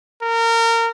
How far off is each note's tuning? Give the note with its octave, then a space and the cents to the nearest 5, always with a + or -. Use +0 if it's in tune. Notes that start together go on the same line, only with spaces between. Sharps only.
A#4 -25